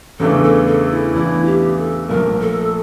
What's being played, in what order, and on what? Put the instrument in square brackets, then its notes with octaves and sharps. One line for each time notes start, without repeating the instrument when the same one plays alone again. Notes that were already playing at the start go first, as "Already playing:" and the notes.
[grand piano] E2 C#3 E3 A3 D4 [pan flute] A4
[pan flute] A4
A4
E4
[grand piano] E2 C#3 E3 A3 D4 [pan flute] E4
[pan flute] G4
A4
[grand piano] A#1 A#2 A3 [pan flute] A#4
[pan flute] A4